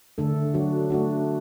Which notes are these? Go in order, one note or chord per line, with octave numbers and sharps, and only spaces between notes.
D3 A3 D4 A4
F#3 D4 F#4
A3 D4 F#4